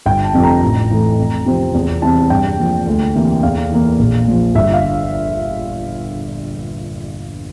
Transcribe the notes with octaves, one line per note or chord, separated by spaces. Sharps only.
G1 G5
A5
F2 C3 F3 A3
A#5
A1
A2 E3 A3
F2
C3 F3 C4
E2
C3 E3 G3 C4 A5
G2 G5
F3 A#3
D2
C3 E3 A#3
E2 F5
E3 A#3
A#1
A#2 F3
G1 E5
F5